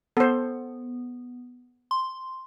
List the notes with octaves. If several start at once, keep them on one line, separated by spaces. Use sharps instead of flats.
B3 A4 C5
C6